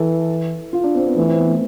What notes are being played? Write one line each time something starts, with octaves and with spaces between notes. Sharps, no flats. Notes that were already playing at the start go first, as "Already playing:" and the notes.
Already playing: E3 A4
F4
D4
C4
B3
E3 A3
C4
B3
A3